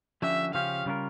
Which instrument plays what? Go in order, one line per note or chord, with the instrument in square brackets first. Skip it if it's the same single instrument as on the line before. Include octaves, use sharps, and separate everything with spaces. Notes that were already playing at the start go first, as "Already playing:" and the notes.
[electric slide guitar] D3 F3 C#4 G4 [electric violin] E5
[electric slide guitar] C#3 F3 C#4 G4 [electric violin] F5
[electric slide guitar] C#3 G3 C#4 F4 A#4